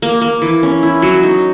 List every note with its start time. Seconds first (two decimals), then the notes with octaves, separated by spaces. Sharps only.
0.02 A#3
0.21 A#3
0.42 E3
0.63 C#4
0.83 E4
1.02 F#3
1.23 D#4